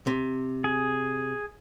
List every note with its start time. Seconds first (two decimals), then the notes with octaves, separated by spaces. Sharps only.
0.07 C3
0.64 G#4